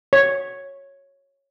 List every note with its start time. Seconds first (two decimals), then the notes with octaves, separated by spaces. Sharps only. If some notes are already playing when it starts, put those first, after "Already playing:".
0.13 C#5